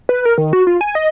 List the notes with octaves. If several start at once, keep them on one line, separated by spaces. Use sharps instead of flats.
B4
A#4
D#3
F#4
F4
G#5
D#5